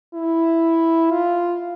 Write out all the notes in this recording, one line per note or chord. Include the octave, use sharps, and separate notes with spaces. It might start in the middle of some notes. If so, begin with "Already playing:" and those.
E4
F4